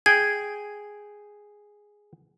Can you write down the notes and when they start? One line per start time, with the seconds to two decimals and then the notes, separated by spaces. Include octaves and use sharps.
0.06 G#4 G5 G#6